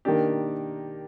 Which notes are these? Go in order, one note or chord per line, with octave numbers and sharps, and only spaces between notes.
D#3 A#3 D4 G4